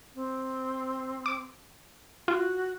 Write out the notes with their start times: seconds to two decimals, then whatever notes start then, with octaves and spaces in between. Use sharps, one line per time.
0.15 C4
1.26 D6
2.28 F4 F#4